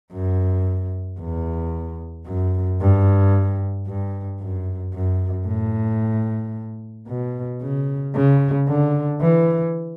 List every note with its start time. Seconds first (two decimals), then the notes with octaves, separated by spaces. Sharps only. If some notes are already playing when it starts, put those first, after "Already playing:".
0.13 F#2
1.20 E2
2.27 F#2
2.81 G2
3.87 G2
4.41 F#2
4.94 F#2
5.47 A2
7.07 B2
7.61 C#3
8.15 C#3
8.69 D3
9.21 E3